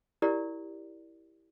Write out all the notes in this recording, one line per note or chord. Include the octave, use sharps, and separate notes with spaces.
E4 G4 A#4 D5